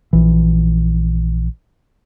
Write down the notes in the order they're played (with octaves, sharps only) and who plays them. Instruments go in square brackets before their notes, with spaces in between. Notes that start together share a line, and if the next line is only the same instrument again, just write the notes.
[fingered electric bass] A#1 E3